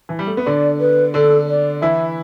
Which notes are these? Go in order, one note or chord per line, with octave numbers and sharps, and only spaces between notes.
E3
G3
A3
B3
D3 D4 D5
B4
D3 D4 A4
D5
E3 E4 E5